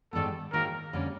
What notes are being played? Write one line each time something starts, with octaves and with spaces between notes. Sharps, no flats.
G#2 D#3 G3 B3 A4
G#2 D#3 F#3 A#3 D#4 A#4
F2 D3 G3 A#3 C#4